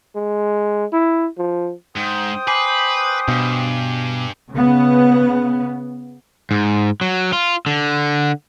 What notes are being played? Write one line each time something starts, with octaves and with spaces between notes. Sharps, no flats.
G#3
E4
F3
G#2 C5 G5 D#6
B4 G#5 D6 C7
G2 B2
C#3 B3
G#2
F#3
F4
D3